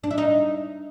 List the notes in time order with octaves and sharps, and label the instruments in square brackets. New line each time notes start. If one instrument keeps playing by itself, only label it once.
[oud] D4
E4
D#4